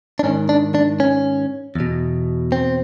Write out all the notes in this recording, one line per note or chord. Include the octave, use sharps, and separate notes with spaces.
D4
G#2 D#3 C#4
D4
D4
C#4
E2 B2
C4